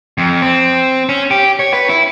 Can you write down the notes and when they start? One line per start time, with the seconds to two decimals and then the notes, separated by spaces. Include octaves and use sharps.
0.18 F2
0.42 C4
1.09 C#4
1.31 G4
1.59 C#5
1.73 B4
1.89 E4